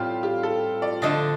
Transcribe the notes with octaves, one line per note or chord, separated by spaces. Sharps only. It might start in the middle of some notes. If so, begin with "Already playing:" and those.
Already playing: A2 G3 C4 F4 G4
G4
A4
D5
D3 F3 A3 D4 D#5